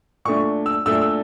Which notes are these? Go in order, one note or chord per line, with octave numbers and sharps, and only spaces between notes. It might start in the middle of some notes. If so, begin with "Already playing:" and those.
A#2 A3 D4 C#6
E6
A#2 A3 D4 E6
E6